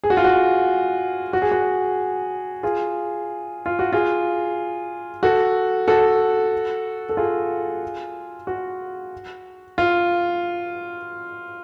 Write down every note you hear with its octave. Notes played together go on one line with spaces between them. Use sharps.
G#4
F#4
F4
F#4
F#4
G#4
F#4
F4 G#4
F4
F#4
F4 G#4
F#4 A4
F#4 A4
A4
F4 G#4
F#4
F4